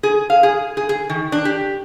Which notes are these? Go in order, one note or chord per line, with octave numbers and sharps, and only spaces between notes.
G#4
F5
G#4
G#4
G#4
D#3
D4
G4